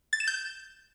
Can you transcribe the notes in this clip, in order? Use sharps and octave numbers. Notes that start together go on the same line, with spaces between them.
A6
E7
G6